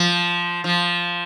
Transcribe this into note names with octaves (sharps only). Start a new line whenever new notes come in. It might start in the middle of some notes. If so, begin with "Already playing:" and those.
Already playing: F3
F3